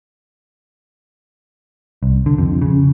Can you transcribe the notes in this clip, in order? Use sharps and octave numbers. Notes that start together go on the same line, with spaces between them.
C2
D3
F2
C#3